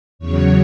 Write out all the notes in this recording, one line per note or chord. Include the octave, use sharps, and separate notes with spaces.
E2 C#3 F#3 C#5